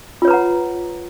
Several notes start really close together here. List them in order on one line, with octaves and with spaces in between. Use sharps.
F4 C#5 B4 A#5 F#5